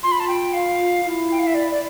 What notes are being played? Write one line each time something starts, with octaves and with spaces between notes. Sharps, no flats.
F4 C6
B5
A5
G5
F5
E4
G5
F5
E5
D5
D5